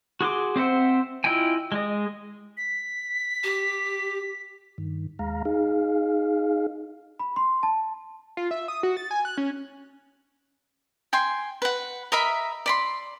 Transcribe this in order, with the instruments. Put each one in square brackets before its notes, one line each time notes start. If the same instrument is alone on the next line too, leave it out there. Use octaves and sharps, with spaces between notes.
[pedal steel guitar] F#4 G#4 C6 D6
C4 C5 E5 F#5
E4 F4 D#5 G5 G#5
G#3 D#5
[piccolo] B6
[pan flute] G4
[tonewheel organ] G2 D#3
D#2 G#3 F5 A#5
D#4 G#4 F5
[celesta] B5
C6
A5
[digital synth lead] F4
E5
D#6
F#4
A6
G#5
F#6
C#4
[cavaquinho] G5 G#5 C6
B4 F#5
A#4 D#5 E5 B5
D5 B5 C6